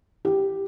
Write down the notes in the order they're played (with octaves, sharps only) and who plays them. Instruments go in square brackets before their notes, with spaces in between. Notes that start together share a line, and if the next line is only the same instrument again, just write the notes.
[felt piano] G4